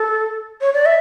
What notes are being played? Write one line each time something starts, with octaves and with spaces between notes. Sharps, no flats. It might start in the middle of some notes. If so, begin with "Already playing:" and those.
Already playing: A4
C#5
D5
E5